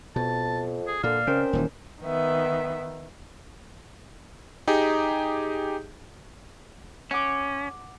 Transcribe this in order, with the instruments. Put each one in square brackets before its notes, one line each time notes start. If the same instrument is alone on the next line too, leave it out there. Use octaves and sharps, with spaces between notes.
[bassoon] F2 [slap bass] B2 [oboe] A5
[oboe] G#4
[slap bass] A#2 [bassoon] D3 [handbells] D5 [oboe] F5
[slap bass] C#3 [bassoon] C4 [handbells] C#4 A#4
[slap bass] D#1 D#2 E3
[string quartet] D#3 B3 E5
[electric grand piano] D#4 G4 G#4
[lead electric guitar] C#4 [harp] F#5 D6